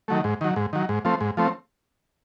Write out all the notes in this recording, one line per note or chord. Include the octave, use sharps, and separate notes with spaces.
D#3 F#3 A3
G#2
D#3 F#3
G#2
D#3 F#3
G#2
F3 A3 C4
G#2
F3 A3 C4